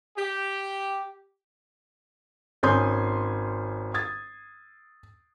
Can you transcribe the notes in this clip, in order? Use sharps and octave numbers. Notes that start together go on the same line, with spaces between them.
G4
G#1 C#4 G#5 C6 D#6 G6
D#6 G#6 A6